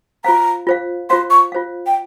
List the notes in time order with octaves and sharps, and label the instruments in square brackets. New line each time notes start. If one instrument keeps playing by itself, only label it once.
[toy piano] F4 C5 F5 [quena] A#5
[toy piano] F4 C5 F5
[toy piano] F4 C5 F5 [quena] C6
[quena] C#6
[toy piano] F4 C5 F5
[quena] G5